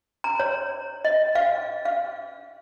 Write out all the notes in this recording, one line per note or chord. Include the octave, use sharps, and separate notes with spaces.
A#5
C#5
D#5
F5
F5